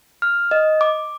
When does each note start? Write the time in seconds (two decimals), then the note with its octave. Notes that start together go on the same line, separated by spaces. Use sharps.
0.22 F6
0.51 D#5
0.81 D6